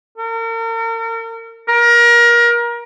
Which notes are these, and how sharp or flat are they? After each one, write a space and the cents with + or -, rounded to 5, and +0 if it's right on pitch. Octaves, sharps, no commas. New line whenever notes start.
A#4 -40
A#4 +25